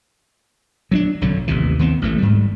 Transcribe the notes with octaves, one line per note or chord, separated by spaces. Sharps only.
F#3 C#4 D4
B1 F#2 D3 F#3
A1 D#2 C3 E3
D#2 D#3 B3 C4
A1 E3 A3
G#2 G3